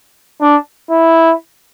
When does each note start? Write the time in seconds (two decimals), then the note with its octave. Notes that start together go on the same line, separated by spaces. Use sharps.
0.41 D4
0.90 E4